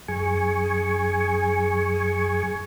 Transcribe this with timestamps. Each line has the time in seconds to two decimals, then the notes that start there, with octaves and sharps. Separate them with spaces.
0.08 F#2 G#4 G#5 C#6